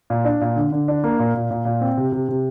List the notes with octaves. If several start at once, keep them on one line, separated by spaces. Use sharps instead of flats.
A#2
D4
A#2
D3
D3
D4
A#3
A#2
A#2
A#2
A#2
C4
C3
C3
C3